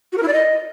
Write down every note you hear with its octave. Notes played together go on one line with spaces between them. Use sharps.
F#4
A#4
E4
D5
D#5